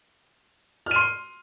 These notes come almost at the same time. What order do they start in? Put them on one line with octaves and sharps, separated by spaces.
F6 D#7 C6